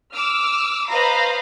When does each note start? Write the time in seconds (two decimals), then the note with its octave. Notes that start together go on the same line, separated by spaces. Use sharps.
0.14 D6 E6 F6
0.88 B4 C5 D#5 F5 A#5 B5